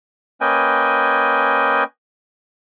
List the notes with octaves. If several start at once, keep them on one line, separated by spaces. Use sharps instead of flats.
A#3 C#4 B4 D#5 G5 G#5